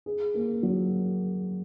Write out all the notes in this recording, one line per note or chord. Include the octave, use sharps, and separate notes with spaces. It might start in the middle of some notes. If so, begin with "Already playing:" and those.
G#4
A#3
F#3